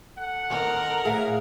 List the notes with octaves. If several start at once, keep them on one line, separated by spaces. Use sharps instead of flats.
A4 F#5
D#3 C4 A#4 D#5
A2 G#4 E5 F5